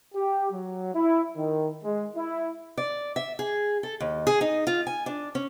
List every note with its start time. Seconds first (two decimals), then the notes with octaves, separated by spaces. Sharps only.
0.15 G4
0.51 F#3
0.94 E4
1.36 D#3
1.84 G#3
2.16 E4
2.77 D5
3.16 E5
3.39 G#4
3.83 A4
4.00 D#2
4.27 G#4
4.41 D#4
4.67 F4
4.87 G#5
5.06 D4
5.35 C#4